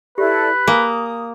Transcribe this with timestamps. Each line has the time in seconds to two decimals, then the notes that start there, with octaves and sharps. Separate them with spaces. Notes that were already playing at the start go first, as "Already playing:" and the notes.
0.18 E4 G4 A4 B4 D5
0.67 A#3 G#5 D#6